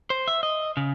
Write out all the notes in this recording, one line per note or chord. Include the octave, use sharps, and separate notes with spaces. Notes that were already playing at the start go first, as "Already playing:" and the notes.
C5
E5
D#5
C#3